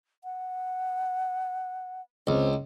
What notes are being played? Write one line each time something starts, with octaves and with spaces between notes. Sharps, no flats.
F#5
C#2 C4